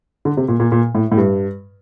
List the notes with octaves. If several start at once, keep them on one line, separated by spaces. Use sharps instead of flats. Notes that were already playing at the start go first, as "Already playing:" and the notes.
D3
C3
A#2
A#2
A#2
A2
A2
G2